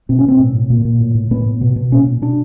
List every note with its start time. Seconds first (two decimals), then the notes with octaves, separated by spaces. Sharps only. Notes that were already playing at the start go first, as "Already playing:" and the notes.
0.09 B2 C4
0.19 C#4
0.25 B2 C4
0.39 A2
0.55 A2
0.70 A#2
0.85 A#2
1.00 A2
1.15 A2
1.31 A2 B3
1.46 A2
1.61 B2
1.76 B2
1.92 A#2 C#4
2.07 A#2
2.22 B2 D4